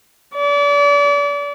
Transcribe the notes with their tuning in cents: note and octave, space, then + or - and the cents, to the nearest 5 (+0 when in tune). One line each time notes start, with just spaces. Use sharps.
D5 -35